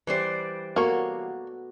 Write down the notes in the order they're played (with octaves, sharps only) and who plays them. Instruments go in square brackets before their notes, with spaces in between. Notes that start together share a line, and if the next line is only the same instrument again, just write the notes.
[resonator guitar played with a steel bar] E3 G3 C5 [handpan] B4 D5
[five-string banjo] A#3 C#5 [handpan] B3 F#4 A4